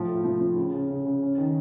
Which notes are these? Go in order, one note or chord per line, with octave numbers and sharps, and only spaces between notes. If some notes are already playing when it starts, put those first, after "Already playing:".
Already playing: A2 F3
A3
F3
F3
C#3
C#3
C#3
C#3
C#4
D#3